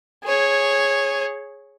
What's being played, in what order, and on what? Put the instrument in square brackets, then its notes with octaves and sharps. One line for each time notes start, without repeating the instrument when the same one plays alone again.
[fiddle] G#4 C#5